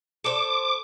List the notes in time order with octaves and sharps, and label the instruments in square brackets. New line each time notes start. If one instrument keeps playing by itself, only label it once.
[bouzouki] A4 C5 [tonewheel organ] D6